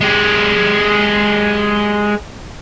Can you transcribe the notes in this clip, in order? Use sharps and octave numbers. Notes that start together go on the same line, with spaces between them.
G#3 G4